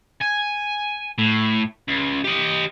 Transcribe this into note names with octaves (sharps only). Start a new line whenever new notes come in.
G#5
A2
C#2
G4 D#5